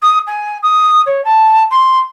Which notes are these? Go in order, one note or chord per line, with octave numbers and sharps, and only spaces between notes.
D#6
G#5
D#6
C#5
A5
C6